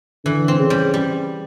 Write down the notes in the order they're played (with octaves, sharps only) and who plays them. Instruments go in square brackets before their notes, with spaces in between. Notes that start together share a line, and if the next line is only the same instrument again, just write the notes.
[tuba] D3 [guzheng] E3
[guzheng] C4
[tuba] C#3
[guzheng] G3
G3